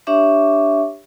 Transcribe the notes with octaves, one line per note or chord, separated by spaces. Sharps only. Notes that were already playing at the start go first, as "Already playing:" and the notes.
D4 G4 C#5 E5 C#6 D6